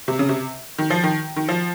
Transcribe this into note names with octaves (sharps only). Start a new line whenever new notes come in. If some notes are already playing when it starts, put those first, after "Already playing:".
C3
C#3
C3
D#3
F3
D#3
D#3
F3